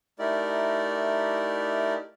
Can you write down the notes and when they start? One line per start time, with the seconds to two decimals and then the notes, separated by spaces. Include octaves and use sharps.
0.19 A3 D#4 E4 G4 A#4 D5